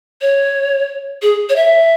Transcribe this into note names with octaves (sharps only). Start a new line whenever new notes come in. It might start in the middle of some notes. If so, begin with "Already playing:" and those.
C#5
G#4
C#5
E5